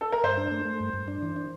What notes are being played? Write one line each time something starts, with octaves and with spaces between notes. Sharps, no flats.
A4
A#4
G2 C5
D4
A3
A3
G2
G2
D4
E3
D4